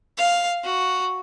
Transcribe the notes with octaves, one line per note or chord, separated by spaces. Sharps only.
F5
F#4